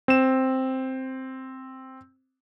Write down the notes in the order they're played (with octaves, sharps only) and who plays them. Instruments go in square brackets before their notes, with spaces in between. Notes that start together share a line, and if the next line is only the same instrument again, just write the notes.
[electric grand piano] C4 E7